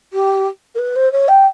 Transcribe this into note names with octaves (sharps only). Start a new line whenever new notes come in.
G4
A#4
B4
C5
C#5
G5